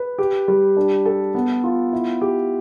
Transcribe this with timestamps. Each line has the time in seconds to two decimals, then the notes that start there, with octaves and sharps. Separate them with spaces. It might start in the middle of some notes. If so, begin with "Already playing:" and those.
Already playing: B4
0.18 G4
0.48 G3
0.77 D4
1.06 A4
1.35 B3
1.64 F4
1.93 E4
2.21 G4